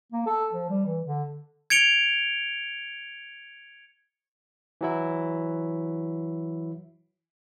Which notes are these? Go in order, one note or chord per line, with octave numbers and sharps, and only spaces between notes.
A#3
A4
F3
G3
E3
D3
G#6 C#7 D7 F7 G7
E3 F#3 E4